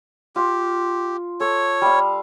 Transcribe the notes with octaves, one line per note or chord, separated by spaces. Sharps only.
F4 G4
A4 C#5
G3 F5